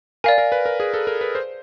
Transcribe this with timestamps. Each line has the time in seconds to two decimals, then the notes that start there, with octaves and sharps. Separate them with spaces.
0.24 A#4 D5 F5 G#5
0.38 A#4
0.52 B4
0.66 A#4
0.80 G#4
0.94 A4
1.07 A#4
1.21 B4
1.35 C5